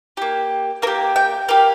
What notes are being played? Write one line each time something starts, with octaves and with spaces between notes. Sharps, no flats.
A#3 G4
A#3 G4 A#4
G5
A#3 G4 F5